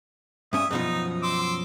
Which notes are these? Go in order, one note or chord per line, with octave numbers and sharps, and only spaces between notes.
G2 C#4 E5 G#5 D#6
F#2 B2 F3 D#4
C6 D6 E6